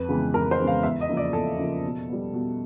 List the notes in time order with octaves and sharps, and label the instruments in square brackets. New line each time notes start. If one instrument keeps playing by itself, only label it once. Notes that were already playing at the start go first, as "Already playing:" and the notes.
Already playing: [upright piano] F2 B4
C#3 E3 G#3 B3
F2 A#4
C5
C#3 E3 G#3 B3
F5
E2 E5
D#5
C#3 F3 A#3
D5
E2 A4
C#3 F3 A#3
B2
G3 B3
B2